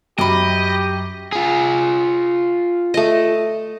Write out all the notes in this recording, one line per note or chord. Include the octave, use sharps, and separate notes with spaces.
F#2 G4 D#5 B5 D6
F4 G#4
A3 D#5